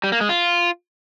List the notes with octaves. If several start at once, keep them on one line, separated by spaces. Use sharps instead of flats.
G3
A#3
G#3
F4